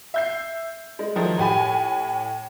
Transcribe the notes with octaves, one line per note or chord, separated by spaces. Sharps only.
E5 G6 C7
G#3
D#3 F3 F#3 A3
A2 G4 G#5 B5